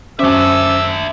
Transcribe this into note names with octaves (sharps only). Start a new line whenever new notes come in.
F#2 C#4 D4 C5 E5 D6 E6